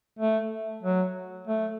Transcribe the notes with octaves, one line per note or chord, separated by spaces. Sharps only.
A3
F#3
A3